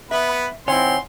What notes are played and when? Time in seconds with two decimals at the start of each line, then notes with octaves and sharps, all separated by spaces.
0.11 B3 B4 E5 B5
0.68 D#3 C4 E4 C#5 F#5 G#5 C6